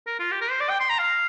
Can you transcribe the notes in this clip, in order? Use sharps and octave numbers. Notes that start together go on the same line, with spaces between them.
A#4
F4
G4
A#4
C5
D5
G5
C6
A#5
F5